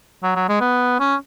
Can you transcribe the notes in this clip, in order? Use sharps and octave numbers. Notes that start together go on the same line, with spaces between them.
F#3
F#3
G#3
B3
C#4